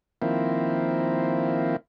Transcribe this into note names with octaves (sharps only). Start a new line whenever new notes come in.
D#3 F3 A#3 C4 E4